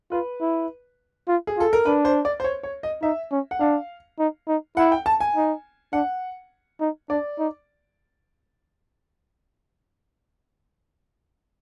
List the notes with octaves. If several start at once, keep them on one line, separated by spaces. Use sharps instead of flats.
F4 B4
E4
F4
G#4
F4 A4
A#4
D4 B4
C5
D5
C5
C#5
C#5
D#5
D#4 E5
C#4
F#5
D4 F5
D#4
D#4
E4 F#5
G5
A5
G#5
D#4
D4 F#5
D#4
D4 D5
D#4